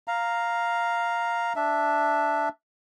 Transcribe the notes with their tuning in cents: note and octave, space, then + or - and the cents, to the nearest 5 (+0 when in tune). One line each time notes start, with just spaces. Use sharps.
F5 +0 A#5 +0
D4 +0 E5 +0